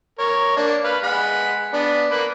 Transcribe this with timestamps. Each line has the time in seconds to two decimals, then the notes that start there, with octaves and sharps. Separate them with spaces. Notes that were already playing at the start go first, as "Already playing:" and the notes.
0.19 A#4 C#5
0.57 A#3 D4
0.84 B4 F5
1.04 G#3 F#5 B5
1.73 B3 D4
2.11 A#3 B4